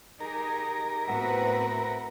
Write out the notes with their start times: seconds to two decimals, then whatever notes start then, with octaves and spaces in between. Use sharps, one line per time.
0.20 D#4 G4 G#4 A#4
1.08 A2 B3 C4 F#4 B4 E5